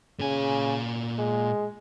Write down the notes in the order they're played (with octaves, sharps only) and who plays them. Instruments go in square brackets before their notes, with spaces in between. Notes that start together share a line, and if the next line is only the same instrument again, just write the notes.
[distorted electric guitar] A#2 G#5 [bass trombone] C#3
[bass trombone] G#3